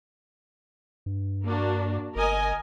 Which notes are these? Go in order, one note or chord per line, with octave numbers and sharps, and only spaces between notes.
G2
A#3 D4 F#4
G1 A#4 D#5 G#5